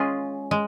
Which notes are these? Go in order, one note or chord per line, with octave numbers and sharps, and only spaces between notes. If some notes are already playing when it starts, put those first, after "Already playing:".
Already playing: G#3 C#4 F4 G#4
G#3